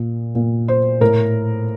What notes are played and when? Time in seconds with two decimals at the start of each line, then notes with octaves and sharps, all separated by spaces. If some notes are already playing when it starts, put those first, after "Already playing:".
Already playing: A#2
0.35 A#2
0.68 C5
1.01 A2 A#4